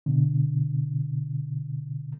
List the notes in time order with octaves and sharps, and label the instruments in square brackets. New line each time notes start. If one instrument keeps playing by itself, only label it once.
[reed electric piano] B2 D3